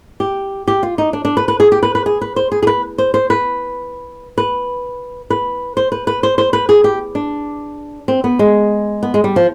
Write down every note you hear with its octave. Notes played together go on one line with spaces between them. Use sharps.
G4
G4
F4
D#4
D4
D4
B4
B4
G#4
G4
B4
B4
G#4
B4
C5
G#4
G#4
B4
C5
C5
B4
B4
B4
C5
B4
B4
C5
C5
B4
G#4
G4
D4
C4
B3
G#3
B3
G#3
G3
F3